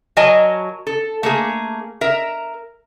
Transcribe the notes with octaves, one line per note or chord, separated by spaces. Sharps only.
F#3 F#4 A#4 D#5 G#5 A5
A4
A3 A#3 G#4
A#4 E5